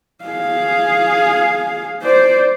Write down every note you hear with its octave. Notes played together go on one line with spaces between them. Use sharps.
G#4 F5
C5 D5